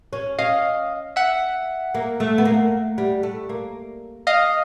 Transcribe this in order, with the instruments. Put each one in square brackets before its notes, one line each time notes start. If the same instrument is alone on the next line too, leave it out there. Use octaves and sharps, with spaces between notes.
[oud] C#4
[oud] C#4 [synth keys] D#5 F5
[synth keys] E5 F#5
[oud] A#3
A3
B3
A#3
G3
A3
A#3
[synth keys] D#5 F5